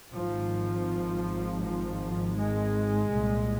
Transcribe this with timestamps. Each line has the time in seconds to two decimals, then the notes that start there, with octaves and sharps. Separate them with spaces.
0.13 G#1 G#2 F3
1.62 F3
2.36 G#3
3.10 C2 A#2